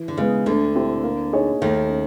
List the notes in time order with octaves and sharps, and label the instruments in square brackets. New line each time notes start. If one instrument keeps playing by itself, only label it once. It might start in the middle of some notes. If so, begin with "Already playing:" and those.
Already playing: [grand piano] E3
[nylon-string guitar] D3
[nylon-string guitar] C#3 [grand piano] G#3 B3
[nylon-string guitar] D2 D3 [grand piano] A3
[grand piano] C4 E4 G4
A#3
D#4 G#4 C#5
[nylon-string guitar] D#2 D#3 [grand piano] A3
[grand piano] C#4